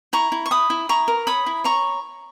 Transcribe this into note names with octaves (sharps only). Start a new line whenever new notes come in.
E4 A#5 C#6
E4
C#6
E4 B5 D#6
E4
E4 A#5 C#6
A#4
C#5 B5 D#6
E4
C#5 A#5 C#6